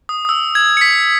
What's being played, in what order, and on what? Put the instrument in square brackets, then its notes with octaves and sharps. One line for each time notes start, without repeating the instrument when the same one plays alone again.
[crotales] D#6
D#6
E6
G#6
C#7
B6